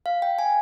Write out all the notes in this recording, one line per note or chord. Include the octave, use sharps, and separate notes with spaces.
F5
G5
G#5